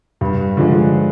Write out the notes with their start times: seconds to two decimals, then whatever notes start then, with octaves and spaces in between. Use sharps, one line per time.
0.21 G2
0.57 D3 F3 G#3